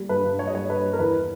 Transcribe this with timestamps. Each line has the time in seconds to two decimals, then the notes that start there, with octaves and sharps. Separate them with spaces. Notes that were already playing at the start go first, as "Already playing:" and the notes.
Already playing: G3 A#3
0.09 G2 B4
0.24 G2
0.39 G3 C#5
0.47 D#5
0.54 G2 C#5
0.69 G2 B4
0.84 G3
0.93 A#4
0.99 E2 B4